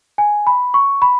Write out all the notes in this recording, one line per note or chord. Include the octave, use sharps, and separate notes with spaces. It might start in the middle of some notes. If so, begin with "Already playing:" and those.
G#5
B5
C#6
B5